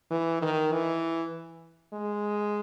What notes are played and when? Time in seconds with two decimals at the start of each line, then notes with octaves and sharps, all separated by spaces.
0.11 E3
0.42 D#3
0.72 E3
1.93 G#3